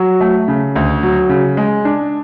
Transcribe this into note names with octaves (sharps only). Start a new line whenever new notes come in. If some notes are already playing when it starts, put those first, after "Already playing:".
Already playing: F#3
A3
C#3
D2
F#3
C#3
G#3
D4